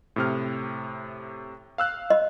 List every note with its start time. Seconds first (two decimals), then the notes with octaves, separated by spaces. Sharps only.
0.16 A2 C3 F6
1.78 F5 E6 F#6
2.10 D#5